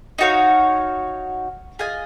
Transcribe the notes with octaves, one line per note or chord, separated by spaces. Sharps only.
D#4 F#4 C#5 F5
F4 G#4 D#5 G#5